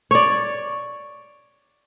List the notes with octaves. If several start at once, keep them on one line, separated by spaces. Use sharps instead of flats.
C#5 D5